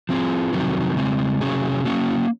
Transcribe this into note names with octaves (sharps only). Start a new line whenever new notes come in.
F3 C4 F4 G#4
F2 C3 D#3 F#3 C4
C#3 G#3 C4
C3 F#3 C#4 G#4
F#3 A#3 C#4